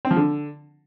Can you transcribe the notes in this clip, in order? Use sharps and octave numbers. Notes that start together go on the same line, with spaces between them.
C4
F3
D3